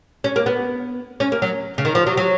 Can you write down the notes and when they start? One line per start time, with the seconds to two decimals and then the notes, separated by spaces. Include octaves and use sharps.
0.24 C#4
0.36 A#3
0.46 B3
1.20 C#4
1.32 A#3
1.42 F#3
1.78 C#3
1.85 D#3
1.95 F3
2.06 F#3
2.17 F#3